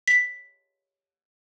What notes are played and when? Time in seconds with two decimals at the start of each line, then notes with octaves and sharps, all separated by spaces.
0.08 B6